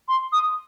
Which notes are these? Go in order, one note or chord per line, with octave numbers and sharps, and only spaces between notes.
C6
D#6